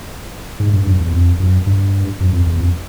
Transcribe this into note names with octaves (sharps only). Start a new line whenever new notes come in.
G#2
G2
F#2
E2
F2
F#2
G2
F#2
F2
E2
F2